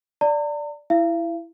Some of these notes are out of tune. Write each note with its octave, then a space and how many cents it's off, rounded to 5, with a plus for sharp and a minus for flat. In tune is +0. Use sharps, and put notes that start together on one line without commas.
D5 +0 A#5 -45
E4 +5 F5 -45